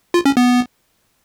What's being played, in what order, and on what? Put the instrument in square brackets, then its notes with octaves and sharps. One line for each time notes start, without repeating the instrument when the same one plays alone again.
[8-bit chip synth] F4
C#4
B3